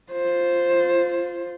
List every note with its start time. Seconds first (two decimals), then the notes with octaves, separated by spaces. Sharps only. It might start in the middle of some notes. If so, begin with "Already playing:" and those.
0.12 F4 C5